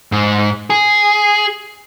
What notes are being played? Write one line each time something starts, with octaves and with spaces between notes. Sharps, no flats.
G#2
G#4